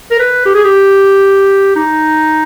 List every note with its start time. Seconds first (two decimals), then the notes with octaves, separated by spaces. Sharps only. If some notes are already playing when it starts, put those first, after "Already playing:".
0.11 A#4
0.19 B4
0.46 G4
0.54 G#4
0.64 G4
1.76 D#4